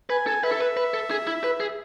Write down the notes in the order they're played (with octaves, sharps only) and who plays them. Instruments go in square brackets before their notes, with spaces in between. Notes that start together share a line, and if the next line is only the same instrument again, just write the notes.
[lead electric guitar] B4 [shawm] G#5
[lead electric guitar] A4 [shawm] G#5
[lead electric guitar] B4 [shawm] E5
[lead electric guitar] A4
B4
B4
A4
G#4
E4
B4
G#4